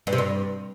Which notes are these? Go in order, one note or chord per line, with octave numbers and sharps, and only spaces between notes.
G2
C3
G2